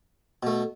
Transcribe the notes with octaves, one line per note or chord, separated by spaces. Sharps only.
B2 A3